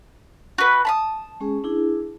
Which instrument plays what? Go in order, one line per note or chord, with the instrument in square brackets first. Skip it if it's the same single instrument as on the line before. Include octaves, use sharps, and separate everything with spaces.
[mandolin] F#4 B4
A5 B5 D#6
[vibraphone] G#3 C#4 G#4
D4 E4 G#4